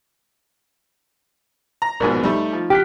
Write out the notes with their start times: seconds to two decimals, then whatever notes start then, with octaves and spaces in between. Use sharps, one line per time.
1.82 A#5
2.00 A#1 G#2 B2 A#4 G#5
2.23 G3 A3 D#4
2.53 F3
2.70 G4 F6 F#6 B6